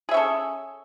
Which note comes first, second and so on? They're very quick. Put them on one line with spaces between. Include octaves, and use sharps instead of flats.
G#4 E5 C#4 A4